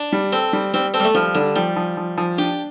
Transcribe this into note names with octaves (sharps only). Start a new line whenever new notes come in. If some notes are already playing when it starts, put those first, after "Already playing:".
Already playing: D4
G3
C4 A4
G3
G3 C4
C4 A4
G3
A3
F3 G3
D3 G3
F3 G3
F3
F3
F3
D4 G4